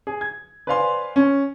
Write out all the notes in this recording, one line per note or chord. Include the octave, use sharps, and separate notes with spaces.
G#4
G#6
B4 C5 D5 F5 G#5 C6
C#4